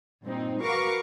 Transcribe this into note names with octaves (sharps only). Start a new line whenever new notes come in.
G2 A#2 C4 D#4
F#4 A#4 B4 F5 C#6 D6